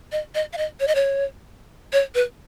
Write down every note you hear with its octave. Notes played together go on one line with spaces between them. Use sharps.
D#5
D#5
F5
D#5
C#5
D#5
C#5
C#5
B4